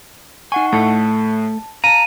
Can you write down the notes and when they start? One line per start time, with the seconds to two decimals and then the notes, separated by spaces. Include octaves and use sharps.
0.52 D#4 F#5 G#5 C#6
0.73 A2 A3 A4 A5
1.84 F5 A5 A#5 D#7